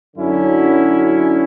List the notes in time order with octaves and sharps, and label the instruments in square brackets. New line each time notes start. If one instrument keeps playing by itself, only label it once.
[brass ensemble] F#2 D3 F#3 C#4 E4